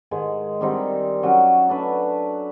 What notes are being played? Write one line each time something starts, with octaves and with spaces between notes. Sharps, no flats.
G#2 D#3 G#3
D#3 G3 C4 D#4
F#3 C#4 F#4
D4 A4 B4 E5